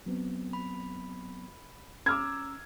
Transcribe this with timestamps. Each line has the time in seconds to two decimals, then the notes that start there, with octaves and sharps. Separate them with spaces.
0.06 F#3 B3 C4
0.53 B5
2.06 C#4 A#5 D6 E6 F6 G#6